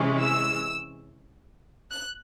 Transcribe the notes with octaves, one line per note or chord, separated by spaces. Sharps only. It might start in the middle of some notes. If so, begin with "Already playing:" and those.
Already playing: C3 E3 G#3 C#4
E6
F#6